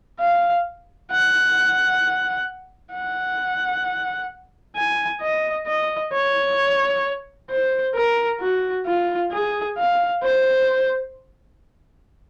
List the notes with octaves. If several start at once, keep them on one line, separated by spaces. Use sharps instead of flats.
F5
F#5
F#5
G#5
D#5
D#5
C#5
C5
A#4
F#4
F4
G#4
F5
C5